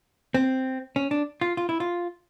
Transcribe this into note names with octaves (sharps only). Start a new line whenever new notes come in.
C4
C#4
D4
F4
F4
E4
F4